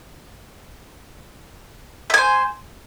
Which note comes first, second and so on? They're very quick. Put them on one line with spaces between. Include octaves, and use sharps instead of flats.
E5 G#5 C5